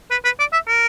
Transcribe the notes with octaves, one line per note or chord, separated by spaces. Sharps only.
B4
B4
D5
E5
A#4